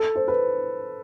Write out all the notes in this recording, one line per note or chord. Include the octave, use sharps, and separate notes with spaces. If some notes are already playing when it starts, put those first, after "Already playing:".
Already playing: A4
C5
B4